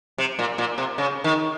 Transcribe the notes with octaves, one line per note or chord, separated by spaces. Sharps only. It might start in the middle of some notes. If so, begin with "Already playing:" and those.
C3
A#2
A#2
C3
C#3
D#3